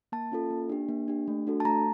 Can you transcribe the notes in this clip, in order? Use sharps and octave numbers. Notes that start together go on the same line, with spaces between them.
A#3 A5
C#4 F4 A4
A#3
D4 G4
A#3
D4 G4
A3
D4 F#4 A4
A5
A3 A#5